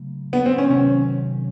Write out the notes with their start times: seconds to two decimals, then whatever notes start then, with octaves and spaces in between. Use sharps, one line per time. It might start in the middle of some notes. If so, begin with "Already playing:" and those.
Already playing: C#3 F#3 A3
0.33 B3
0.46 C4
0.58 C#4
0.70 C3 D#3 F#3 C#4